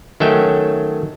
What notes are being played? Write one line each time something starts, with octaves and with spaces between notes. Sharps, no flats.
D#3 F#3 A3 C#4 E5 G5